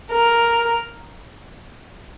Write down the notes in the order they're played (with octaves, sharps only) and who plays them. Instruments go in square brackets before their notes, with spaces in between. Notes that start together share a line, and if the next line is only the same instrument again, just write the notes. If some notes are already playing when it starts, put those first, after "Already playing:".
[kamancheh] A#4